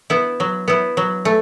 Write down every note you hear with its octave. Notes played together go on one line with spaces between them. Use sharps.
B3 E4
F#3
B3 E4
F#3
A3